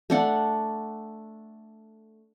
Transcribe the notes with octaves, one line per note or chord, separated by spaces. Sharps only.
A3 D4 F#5